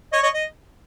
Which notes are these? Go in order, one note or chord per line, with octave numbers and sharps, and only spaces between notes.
C#5 D#5
C#5 D#5
D#5